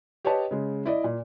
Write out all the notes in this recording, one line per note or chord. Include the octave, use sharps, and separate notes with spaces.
G4 B4 C#5 D#5 A5
C#3 G#3
E4 D5 D#5
A#2